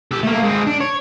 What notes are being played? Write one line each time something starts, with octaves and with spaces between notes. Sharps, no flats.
G4 A4
A3 A#3
G#3 C4
D4
C#5